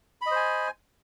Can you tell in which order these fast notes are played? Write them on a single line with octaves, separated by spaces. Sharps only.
B5 D#5 C5 G#5